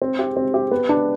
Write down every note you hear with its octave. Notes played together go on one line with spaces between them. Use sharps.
C4
G4
C4
G4
B3
D4